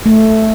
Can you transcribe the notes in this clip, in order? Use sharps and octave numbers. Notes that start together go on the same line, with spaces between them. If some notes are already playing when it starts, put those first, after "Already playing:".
A3